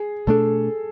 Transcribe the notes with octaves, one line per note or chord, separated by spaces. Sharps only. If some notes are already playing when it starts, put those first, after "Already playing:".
Already playing: G#4
B2 A3 D4 A4